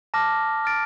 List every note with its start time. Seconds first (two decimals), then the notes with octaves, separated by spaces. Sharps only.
0.14 A5 D6 F6 A#6
0.65 F6 A6 D7